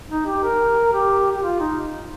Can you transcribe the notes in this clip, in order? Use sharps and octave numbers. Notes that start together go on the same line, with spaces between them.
D#4
G4
A#4
G4
G4
F4
D#4